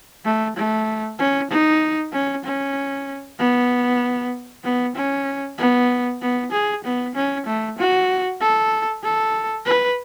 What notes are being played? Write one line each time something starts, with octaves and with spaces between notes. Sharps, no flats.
A3
A3
C#4
D#4
C#4
C#4
B3
B3
C#4
B3
B3
G#4
B3
C#4
A3
F#4
A4
A4
B4